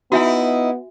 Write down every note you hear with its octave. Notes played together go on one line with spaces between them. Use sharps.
B3 D#4 E4 F#4 E5 G#5